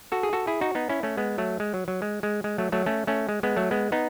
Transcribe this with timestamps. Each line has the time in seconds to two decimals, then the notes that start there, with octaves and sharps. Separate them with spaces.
0.12 F#4 A4
0.23 G#4
0.33 F#4 A4
0.47 E4 G#4
0.61 D#4 F#4
0.75 B3 D#4
0.89 C#4 E4
1.03 A3 C#4
1.17 G#3 B3
1.38 F#3 A3
1.60 G#3
1.74 F#3
1.88 F#3
2.02 G#3
2.23 G#3
2.44 G#3
2.58 F#3 A3
2.72 F#3 A3
2.86 A3 C#4
3.07 A3 C#4
3.29 G#3
3.43 G#3 B3
3.57 F#3 A3
3.71 G#3 B3
3.92 B3 D#4